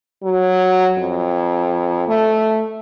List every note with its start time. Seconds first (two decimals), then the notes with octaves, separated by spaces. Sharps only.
0.23 F#3
0.98 F2
2.08 A3